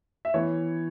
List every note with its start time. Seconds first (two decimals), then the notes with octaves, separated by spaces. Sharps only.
0.25 E5
0.34 E3 B3 C#5